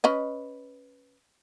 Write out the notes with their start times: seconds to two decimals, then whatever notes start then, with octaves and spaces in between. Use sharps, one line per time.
0.04 C#4 B4 D#5